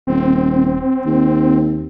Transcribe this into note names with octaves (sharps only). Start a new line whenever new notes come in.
D#1 C4
D#2